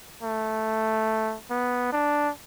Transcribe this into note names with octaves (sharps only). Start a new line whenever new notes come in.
A3
B3
D4